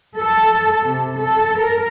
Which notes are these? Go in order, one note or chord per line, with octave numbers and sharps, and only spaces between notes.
A4
C3
A4
A#4